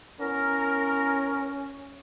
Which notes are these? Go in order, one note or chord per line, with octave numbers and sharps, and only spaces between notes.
B3 C#4 E4 A#4